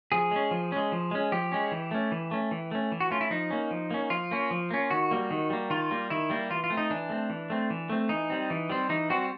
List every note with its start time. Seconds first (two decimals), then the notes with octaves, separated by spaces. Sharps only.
0.12 F3 G#4
0.31 G#3 C#4
0.51 F3
0.72 G#3 C#4
0.92 F3
1.11 G#3 C#4
1.32 F3 G4
1.52 G#3 C#4
1.72 E3
1.91 A3 C#4
2.12 E3
2.31 A3 C#4
2.51 E3
2.71 A3 C#4
2.92 E3
3.00 F#4
3.10 A3 C#4 F4
3.21 E4
3.30 F3 D#4
3.50 A#3 C#4
3.71 F3
3.91 A#3 C#4
4.10 F3 F4
4.31 A#3 C#4
4.51 F3
4.71 A#3 C#4
4.90 D#3 F#4
5.11 G3 A#3
5.31 D#3
5.50 G3 A#3
5.70 D#3 F4
5.91 G3 A#3
6.10 D#3 E4
6.30 G3 A#3
6.50 E3 F4
6.64 F4
6.70 A3 C4
6.77 D#4
6.91 E3 D4
7.09 A3 C4
7.30 E3
7.50 A3 C4
7.70 E3
7.90 A3 C4
8.09 E3 D#4
8.30 G3 C4
8.50 E3
8.70 G3 C4
8.89 E3 D#4
9.10 G3 C4 F#4